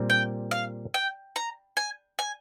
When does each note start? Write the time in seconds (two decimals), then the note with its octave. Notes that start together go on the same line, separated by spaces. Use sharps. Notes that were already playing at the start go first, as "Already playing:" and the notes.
Already playing: A#2 G3 C4
0.10 G5
0.51 F5
0.94 G5
1.36 A#5
1.77 G#5
2.19 G#5